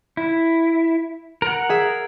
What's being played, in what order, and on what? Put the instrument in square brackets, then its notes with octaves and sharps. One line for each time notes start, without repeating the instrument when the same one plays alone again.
[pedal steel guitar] E4
A#4 F#5
[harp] G#4 E5